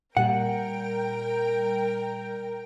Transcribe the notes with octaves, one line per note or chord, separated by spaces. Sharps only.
A#2 G3 A#4 F#5 G5